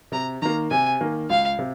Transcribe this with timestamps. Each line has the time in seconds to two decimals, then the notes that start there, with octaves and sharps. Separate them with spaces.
0.12 C3 A#5
0.42 D#3 A#3 A#5
0.71 C3 G#5
1.01 D#3 A#3
1.30 C#2 F5
1.59 C3